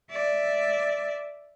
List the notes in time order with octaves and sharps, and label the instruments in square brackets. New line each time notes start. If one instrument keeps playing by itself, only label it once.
[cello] D5 E5